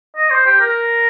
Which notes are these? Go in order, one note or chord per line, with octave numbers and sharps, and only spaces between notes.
D#5
C5
G4
A#4